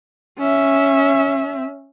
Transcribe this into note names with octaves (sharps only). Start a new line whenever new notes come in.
C#4 E5